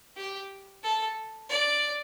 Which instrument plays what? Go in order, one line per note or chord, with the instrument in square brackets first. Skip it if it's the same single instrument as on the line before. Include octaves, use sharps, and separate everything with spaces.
[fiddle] G4
A4
D5